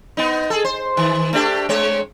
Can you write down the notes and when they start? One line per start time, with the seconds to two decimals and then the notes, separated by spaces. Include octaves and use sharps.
0.17 B3 D#4
0.50 G#4 A4
0.65 C5
0.97 D#3
1.33 A3 D4 G4
1.69 G#3 C4 C#5